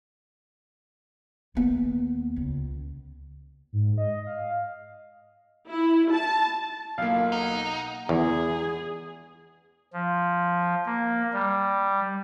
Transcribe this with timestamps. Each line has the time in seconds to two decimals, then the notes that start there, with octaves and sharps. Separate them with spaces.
1.55 D#2 B3
2.36 C#2
3.73 G#2
3.98 D#5
4.27 F5
5.68 E4
6.12 A5
6.98 B1 A#3 F4 F5
7.32 D#4 F#5
8.09 E2 G#4
9.93 F3
10.86 A#3
11.33 G3